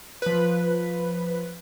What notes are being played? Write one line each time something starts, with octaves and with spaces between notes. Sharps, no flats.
F3 B4